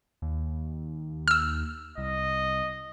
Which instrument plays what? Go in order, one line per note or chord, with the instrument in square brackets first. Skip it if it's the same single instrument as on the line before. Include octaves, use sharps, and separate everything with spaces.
[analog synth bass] D#2
[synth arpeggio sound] E6 F6
[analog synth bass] C2 [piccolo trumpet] D#5